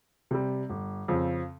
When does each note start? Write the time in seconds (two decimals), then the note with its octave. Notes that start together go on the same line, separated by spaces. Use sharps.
0.31 C3 G3
0.70 G1
1.08 F2 C#3 F3 C4